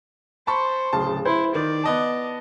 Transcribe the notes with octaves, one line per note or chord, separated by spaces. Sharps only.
C5 A5 B5 C#6
D1 C#3 A5
E4 C5
D#3 D5
B3 D#5 A5